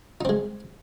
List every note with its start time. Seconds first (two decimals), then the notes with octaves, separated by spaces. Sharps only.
0.21 D#4
0.25 C4
0.29 G#3